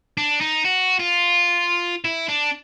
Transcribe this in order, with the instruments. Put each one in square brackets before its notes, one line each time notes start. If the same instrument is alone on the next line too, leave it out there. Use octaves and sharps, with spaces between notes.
[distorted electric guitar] D4
D#4
F#4
F4
E4
D4